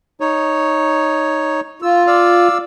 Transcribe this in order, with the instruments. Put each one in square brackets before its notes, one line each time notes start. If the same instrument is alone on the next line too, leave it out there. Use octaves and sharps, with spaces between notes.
[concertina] D#4 C#5
[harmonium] F4 [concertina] E6
[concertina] D5 F5 E6